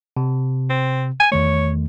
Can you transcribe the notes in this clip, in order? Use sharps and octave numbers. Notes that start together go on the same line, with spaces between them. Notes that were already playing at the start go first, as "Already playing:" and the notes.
C3
C4
G#5
E2 D#3 A3 C#5